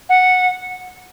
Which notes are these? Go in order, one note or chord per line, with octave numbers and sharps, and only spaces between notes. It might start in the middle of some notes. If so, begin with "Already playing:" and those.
F#5